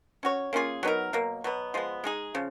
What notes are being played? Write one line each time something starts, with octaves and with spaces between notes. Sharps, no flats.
C#4 F#4 C#5
A#3 C#4 F4 G#4
F#3 B3 D#4 A#4
B2 F#3 A#3
B2 F#3 B3
F3 G#3 B3
G#3 D#4 G#4
C#3 F3